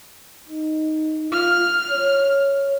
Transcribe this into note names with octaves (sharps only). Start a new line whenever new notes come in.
D#4
F4 F6
C#5